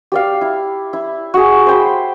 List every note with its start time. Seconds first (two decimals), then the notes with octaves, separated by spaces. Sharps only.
0.12 G4 D5 F5
0.41 E4
0.93 E4
1.34 F#4 G#4
1.67 C5 G5 B5